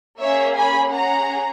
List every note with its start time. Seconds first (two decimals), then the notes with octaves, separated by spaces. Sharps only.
0.20 A#3 C#4 G#4 C#5 E5
0.56 G#5 B5
0.91 C#4 G#4 F#5 A#5